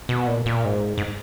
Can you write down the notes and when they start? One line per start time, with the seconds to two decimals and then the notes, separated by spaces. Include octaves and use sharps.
0.09 B2
0.27 A#2
0.46 A#2
0.65 G#2
0.98 G#2